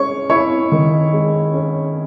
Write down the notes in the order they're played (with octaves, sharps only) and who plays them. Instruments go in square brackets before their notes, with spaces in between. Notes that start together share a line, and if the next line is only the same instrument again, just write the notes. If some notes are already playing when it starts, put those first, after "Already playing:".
Already playing: [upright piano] G#3 C#4 C#5 C#6
E4 C#5 C#6
D#3
G#3
C#4